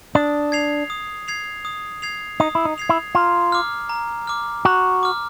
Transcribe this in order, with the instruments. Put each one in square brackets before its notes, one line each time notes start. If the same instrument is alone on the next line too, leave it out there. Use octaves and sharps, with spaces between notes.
[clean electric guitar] D4 [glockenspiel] D#6
[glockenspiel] G#6 C7 F7
D#6
G#6 C7 F7
D#6
G#6 C7 F7
[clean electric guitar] D#4 [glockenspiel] D#6
[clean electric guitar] E4
D#4
[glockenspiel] G#6 C7 F7
[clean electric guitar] E4
[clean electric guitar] F4 [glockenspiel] A#5
[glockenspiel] D6 F6
A#5
D6 F6
[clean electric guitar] F#4 [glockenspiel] A#5
[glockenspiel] D6 F6